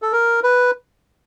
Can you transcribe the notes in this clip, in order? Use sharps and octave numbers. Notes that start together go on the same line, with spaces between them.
A4
A#4
B4